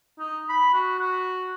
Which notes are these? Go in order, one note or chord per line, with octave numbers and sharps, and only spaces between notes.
D#4
B5
F#4
F#4